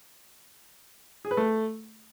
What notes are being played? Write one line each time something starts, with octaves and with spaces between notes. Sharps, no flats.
G#4
B4
A3